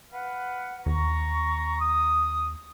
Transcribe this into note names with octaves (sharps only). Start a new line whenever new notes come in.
B4 F5 F#5
D#2 A#5 C#6
D#6